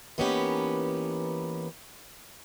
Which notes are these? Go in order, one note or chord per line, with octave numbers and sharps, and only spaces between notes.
E3 A#3 B3 C#4 D#4 G4